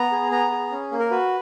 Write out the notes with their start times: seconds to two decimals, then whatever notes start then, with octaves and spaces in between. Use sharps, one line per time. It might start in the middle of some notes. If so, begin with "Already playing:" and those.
Already playing: B3 A#5
0.12 G#4
0.31 B3 A#5
0.51 G#4
0.71 C#4
0.92 A#3
0.99 A#4
1.11 F#4 B4